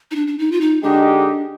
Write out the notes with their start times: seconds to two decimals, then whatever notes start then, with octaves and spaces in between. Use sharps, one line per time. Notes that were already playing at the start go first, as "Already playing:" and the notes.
0.11 D#4
0.15 D4
0.27 D4
0.38 D#4
0.52 F4
0.61 D#4
0.83 D3 G#3 D4 D#4 G4